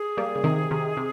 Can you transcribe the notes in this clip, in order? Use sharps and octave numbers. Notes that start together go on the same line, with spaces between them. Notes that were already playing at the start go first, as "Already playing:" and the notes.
Already playing: G#4
G3 A#3
C#3
C3 D#3
C3 D#3
C3